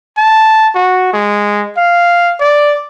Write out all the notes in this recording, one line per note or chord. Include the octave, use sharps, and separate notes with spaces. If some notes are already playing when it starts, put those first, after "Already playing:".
A5
F#4
G#3
F5
D5